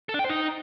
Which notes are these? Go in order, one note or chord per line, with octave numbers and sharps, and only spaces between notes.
A4
D4
G5
C5
D#4